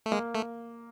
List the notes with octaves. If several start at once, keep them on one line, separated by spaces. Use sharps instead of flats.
A3
G#3 A#3
A3